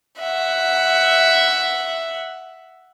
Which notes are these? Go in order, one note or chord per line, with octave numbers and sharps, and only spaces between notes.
E5 F#5